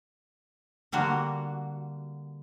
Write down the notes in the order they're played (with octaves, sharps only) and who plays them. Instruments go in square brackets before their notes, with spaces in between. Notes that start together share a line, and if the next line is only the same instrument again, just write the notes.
[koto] D3 G3 A#3 F#4